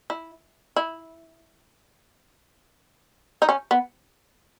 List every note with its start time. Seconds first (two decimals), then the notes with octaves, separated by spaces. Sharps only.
0.10 E4
0.76 E4
3.42 D#4
3.49 C#4
3.71 B3